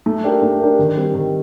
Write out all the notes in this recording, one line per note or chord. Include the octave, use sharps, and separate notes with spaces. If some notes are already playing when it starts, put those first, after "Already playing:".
A3
D4 G4 A#4
A3
D4 G4 A#4
D#3
G3 C4
D#3